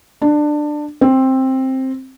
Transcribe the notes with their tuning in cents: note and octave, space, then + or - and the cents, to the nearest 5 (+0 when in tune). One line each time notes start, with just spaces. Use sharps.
D4 +20
C4 +10